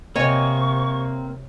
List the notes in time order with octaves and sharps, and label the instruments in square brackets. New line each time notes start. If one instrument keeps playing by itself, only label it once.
[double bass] C3 [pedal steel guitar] A#3 C4 [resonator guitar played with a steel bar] C#5 D#5 G#5 [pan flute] C#6